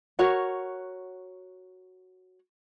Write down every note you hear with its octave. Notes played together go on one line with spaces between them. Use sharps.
F#4 A#4 C#5 F#5